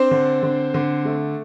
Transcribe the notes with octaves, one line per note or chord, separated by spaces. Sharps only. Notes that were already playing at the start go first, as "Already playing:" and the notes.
Already playing: C4 D4 C5
D3
D3
D3
A3